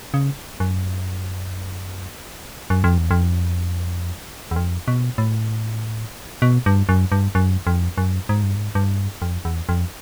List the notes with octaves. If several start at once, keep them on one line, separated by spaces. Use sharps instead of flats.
C#3
F#2
F#2
F2
E2
F2
E2
F2
B2
A2
B2
G2
F#2
G2
F#2
F2
F#2
G#2
G2
G#2
G2
F2
E2
F2